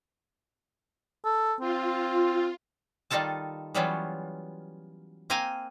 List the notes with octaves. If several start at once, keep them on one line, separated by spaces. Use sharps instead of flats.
A4
C4 F4
D#3 G3 D#4 F4 A4 A5
E3 F#3 G3 B3 C#4 F4
A#3 C4 F5 G5 G#5 A#5